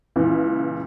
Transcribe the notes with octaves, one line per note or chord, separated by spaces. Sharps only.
C#2 A#2 E3